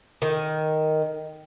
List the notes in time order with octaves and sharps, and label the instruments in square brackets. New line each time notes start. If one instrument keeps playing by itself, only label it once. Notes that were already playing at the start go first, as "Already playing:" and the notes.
[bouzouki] D#3